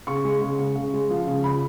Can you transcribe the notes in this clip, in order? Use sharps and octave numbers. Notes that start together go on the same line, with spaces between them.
C#3 C#6
G#3
C#3
C#3
C#3
G#3
F3
C#3
C#3 B5